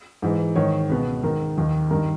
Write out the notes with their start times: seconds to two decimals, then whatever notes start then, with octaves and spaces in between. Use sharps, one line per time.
0.22 G#2 E3
0.56 G#2 D#3 C#5
0.89 C#2 B2 B4
1.23 G#2 D#3 A#4
1.58 D#2 D#3
1.91 G2 D#3 A#4